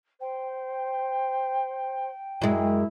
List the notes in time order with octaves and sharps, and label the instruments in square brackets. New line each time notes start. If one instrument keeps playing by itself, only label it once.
[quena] C5 [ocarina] G5
[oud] F#2 G#3 [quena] E4